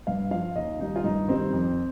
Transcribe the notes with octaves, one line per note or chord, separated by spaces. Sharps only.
G2 F5
F3 F5
D#2 D#5
D#3 G3 D#4
F4
G2 D#4
D#3 G3 C4
F2